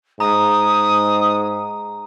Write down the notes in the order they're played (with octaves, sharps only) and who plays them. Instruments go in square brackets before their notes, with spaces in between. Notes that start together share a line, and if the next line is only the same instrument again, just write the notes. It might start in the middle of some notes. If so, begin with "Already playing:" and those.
[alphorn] G#2 [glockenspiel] A#5 [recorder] D#6